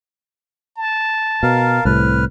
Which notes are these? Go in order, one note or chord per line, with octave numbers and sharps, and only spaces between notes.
A5
B2 A#4 F5
C2 A2 C3 B4 F6